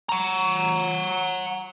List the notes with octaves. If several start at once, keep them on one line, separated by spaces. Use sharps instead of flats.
F#5 A#5